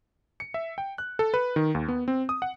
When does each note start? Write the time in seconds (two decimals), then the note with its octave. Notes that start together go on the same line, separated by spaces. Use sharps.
0.40 C#7
0.54 E5
0.78 G5
0.98 F#6
1.19 A4
1.34 B4
1.56 D#3
1.75 D#2
1.88 B3
2.08 C4
2.29 D#6
2.42 F#5